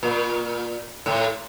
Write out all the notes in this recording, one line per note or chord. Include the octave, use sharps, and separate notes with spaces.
A#2
A2